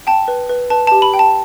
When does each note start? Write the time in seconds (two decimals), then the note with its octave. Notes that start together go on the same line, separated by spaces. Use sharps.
0.07 G5 A5
0.28 B4
0.49 B4
0.70 B4 A5
0.87 A5
0.91 G4
1.02 B5
1.13 G5
1.19 A5